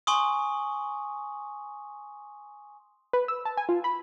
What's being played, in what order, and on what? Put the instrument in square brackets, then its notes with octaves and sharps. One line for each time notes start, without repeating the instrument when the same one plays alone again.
[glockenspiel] G#5 C6 C#6 D#6
[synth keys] B4
E6
A5
G#5
F4
B5